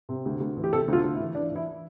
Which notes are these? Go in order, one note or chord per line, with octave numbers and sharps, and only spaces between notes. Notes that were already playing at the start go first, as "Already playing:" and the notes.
C3
D2
D2
E3
G4
C3 A4
D2 F4
D2
E4
E3
E3 D4
E3 E4